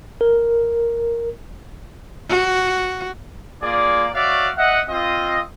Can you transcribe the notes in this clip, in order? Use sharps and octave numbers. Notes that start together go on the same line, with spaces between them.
A#4
F#4
A#3 F4 G#4 D5
F#4 C#5 D5 E5 F5
D#5 E5 F#5
C4 F4 D#5